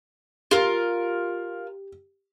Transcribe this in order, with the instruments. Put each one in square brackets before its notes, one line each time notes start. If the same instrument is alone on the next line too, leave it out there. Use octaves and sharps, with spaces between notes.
[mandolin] F4 A#4 [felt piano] G4